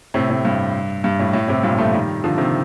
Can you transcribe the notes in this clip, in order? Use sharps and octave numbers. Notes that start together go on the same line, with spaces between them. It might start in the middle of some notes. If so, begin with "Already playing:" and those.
A2 C3
A2
G2
G2
A2
A2
A2 C3
G2 A#2
F3 A3
D#3 G3
D3 F3
C3 D#3